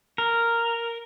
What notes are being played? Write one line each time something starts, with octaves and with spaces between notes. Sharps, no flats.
A#4